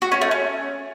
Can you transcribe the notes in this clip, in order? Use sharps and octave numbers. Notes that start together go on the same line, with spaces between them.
F#4
C#4
A3
C#4